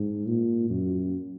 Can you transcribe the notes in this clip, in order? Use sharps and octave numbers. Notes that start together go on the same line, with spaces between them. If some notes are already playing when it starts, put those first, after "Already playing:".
Already playing: G#2
A#2
F#2